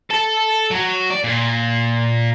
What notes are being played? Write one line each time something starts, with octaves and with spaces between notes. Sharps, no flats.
A4 A5
F#3
D5
A#2